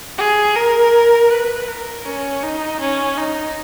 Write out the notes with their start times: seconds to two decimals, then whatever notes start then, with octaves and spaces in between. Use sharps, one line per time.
0.18 G#4
0.56 A#4
1.30 B4
1.68 A#4
2.06 C#4
2.43 D#4
2.81 C#4
3.17 D#4